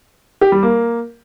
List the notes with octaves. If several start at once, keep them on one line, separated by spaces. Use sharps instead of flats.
G4
G3
A#3